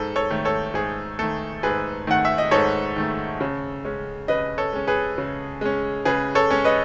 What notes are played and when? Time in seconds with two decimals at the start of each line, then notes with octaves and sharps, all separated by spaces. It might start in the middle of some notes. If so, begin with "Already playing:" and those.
Already playing: G#2 A4
0.16 A4 C#5
0.31 D#3 A3
0.45 A4 C#5
0.74 G#2 G#4
1.19 D#3 A3 A4
1.63 G#2 G#4 B4
2.07 D#3 A3 F#5
2.25 E5
2.38 D#5
2.51 G#2 A4 C#5
2.96 D#3 A3
3.41 C#3
3.85 G#3 C#4
4.28 C#3 B4 D#5
4.58 A4 C#5
4.73 G#3 C#4
4.87 G#4 B4
5.18 C#3
5.61 G#3 C#4
6.05 C#3 G#4 B4
6.35 A4 C#5
6.50 G#3 C#4
6.64 B4 D#5